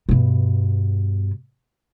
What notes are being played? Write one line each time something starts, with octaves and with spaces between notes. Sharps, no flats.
G2 B2